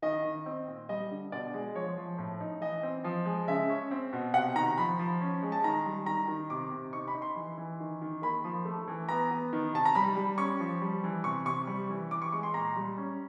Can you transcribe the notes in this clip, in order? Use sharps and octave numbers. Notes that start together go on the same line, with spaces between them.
D#3 D#5
D#3
C4
A#2
G3 D#5
D3
B2 D5
G#3
F3 C#5
F3
A2
D#4
E3 D#5
C4
F3
G#3
C#3 E5
C#4
C4
B2
C3 F#5
D#3 A#5
F3 B5
F3
C#4
G#3
A5
D#3 A#5
G3
D#3 A#5
D#3
C3 D6
C3
D#4 C#6
B5
D#4
C6
E3
E3
D#3
D#3
A#3 B5
F3
A3
E3
B3 A#5
B3
D#3
C3 A5
A#5
G3 B5
G3
C#4 C#6
F3
G3
E3
C3 C#6
C3 C#6
G3
E3
E3 D6
C#6
G#3 C#6
C6
A#2 A#5
G3
C#4